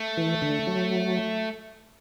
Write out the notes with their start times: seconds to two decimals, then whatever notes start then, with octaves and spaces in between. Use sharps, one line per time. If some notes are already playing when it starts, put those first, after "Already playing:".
Already playing: A3
0.17 E3
0.42 D3
0.67 F#3